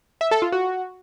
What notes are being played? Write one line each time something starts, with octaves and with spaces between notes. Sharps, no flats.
E5
A4
F4
F#4